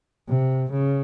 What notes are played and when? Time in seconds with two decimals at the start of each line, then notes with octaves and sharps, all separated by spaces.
0.29 C3
0.72 C#3